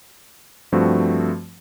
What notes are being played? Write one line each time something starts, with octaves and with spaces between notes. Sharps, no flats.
G2 F3 A3 C4 F#4